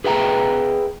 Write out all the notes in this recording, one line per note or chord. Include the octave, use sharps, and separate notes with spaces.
G#4 B4 E5 G5 A#5